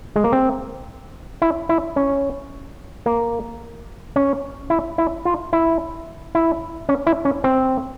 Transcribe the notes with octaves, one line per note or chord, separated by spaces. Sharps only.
G#3
A#3
C4
E4
E4
C#4
A#3
C#4
E4
E4
F4
E4
E4
C#4
E4
C#4
C4